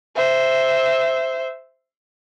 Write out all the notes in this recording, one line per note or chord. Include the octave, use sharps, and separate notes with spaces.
C5 E5